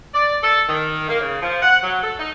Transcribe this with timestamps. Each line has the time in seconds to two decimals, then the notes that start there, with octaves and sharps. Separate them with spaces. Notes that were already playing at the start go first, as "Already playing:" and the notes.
0.14 D5
0.42 A4
0.68 D#3
1.08 A#3
1.21 C#3
1.41 F3
1.61 F#5
1.82 F#3
2.02 A4
2.18 D#4